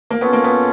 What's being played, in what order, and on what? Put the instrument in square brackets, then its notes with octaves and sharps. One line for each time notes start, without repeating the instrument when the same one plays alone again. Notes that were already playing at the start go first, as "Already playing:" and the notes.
[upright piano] A#3
[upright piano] B3 [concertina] C#4 F4 A4 C#5
[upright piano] A#3
B3